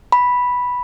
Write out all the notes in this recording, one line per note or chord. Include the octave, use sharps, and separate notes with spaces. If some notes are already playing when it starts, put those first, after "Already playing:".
B5